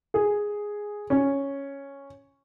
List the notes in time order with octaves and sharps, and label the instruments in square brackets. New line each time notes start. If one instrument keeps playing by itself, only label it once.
[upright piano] G#4
C#4